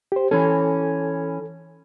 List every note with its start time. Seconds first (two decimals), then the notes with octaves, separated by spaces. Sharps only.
0.12 G4 C5
0.31 E3 C#4 A4